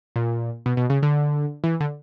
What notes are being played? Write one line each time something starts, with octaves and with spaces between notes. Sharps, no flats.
A#2
B2
B2
C#3
D3
E3
D3